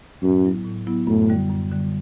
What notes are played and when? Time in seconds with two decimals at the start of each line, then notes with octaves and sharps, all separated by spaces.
0.23 F#2 A2
0.44 F#3 B3 E4
0.65 A2
0.87 F#3 B3 E4
1.07 F#2 A2
1.29 D3 G3
1.50 F#2
1.71 D3 G3